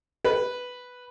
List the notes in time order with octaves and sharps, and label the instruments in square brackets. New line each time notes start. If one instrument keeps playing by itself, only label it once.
[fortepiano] B4